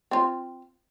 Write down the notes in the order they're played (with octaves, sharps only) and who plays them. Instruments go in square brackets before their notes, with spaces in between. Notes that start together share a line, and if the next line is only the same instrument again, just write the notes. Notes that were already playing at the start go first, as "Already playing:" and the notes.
[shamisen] C4 F4